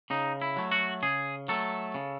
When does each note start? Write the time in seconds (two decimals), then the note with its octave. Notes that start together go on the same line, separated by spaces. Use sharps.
0.10 C#3 D#4
0.42 E4
0.56 F#3 A3
0.72 F#4
1.03 C#3 G#4
1.48 F#3 A3 A4
1.94 C#3